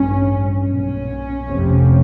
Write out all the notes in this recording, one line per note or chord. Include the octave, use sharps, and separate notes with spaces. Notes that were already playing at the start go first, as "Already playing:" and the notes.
Already playing: A1 G2 C#4
B1 A#2 C#4
F1 F2 C3